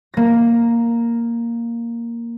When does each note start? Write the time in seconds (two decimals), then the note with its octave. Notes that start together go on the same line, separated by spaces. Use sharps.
0.14 A#3 A#6